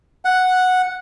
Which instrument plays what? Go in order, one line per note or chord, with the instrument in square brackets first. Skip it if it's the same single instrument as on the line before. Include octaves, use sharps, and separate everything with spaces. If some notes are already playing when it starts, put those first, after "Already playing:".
[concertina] F#5